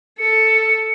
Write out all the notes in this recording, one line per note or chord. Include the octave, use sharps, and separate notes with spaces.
A4 C#7